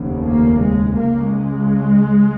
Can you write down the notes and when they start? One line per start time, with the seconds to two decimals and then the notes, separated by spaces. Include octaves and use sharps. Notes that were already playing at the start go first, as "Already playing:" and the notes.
Already playing: F1 D#2 C#3
0.27 A#3
0.61 G#3
0.95 C#2 C#3 A#3
1.29 G#3